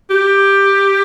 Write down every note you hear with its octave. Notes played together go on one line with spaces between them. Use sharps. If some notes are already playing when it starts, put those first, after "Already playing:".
G4